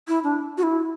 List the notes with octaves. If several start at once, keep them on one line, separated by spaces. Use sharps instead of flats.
E4
D4
F#4
E4